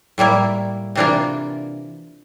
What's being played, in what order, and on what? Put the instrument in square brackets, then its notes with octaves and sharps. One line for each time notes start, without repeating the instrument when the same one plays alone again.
[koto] A2 G3 A#3 E4
C3 E3 A#3 D4 F4